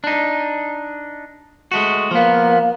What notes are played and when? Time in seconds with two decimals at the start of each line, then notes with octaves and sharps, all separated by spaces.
0.04 D4 D#4
1.72 G#3 A3 F#4
2.11 F3 A#3 B3